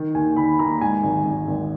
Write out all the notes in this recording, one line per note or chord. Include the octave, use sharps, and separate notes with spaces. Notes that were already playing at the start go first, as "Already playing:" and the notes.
Already playing: D#3
D#2 G#5
D#3 B5
D#2 A#5
G#2 G#5
G#1
G#1
G#1